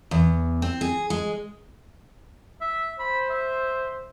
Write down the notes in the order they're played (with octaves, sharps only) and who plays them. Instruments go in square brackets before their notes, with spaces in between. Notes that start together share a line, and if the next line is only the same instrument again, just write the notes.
[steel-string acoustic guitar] E2
C4
G#4
G#3
[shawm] E5
[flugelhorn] C5 [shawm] B5
[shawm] E5